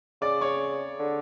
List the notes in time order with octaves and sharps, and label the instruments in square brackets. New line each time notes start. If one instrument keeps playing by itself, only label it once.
[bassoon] C#3 [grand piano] D5 D6
[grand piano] C#5 C#6
[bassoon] D3